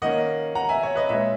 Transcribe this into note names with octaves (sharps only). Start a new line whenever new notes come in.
D#3 A#3 C#4 D#5 F#5
F#5 A#5
E5 G#5
C#5 E5
B4 D#5
A#2 G#3 C#4 C#5 E5